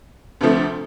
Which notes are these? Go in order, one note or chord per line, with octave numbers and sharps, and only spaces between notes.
D2 C3 F3 A3